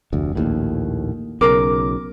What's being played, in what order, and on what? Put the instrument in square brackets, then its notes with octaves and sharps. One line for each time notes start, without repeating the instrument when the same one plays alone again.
[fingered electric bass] F1 D2
A#1 D#2 A2
[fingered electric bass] B1 C#3 [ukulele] A#4 [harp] D6